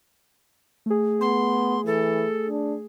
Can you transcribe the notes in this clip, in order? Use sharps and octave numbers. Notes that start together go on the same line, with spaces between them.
A3 G#4
B3 C6
E3 A4
D4